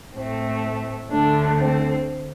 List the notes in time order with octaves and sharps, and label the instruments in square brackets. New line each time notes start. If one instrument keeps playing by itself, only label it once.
[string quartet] A2 A3 C4
D2 D3 A3 D4
C4